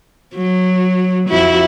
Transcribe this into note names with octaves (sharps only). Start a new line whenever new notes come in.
F#3
F2 E4 F#4